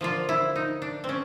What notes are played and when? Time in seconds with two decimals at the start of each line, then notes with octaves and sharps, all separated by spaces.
0.01 D3 F3 A#3 F4
0.29 E4
0.56 D#4
0.82 D4
1.04 C4
1.09 C#4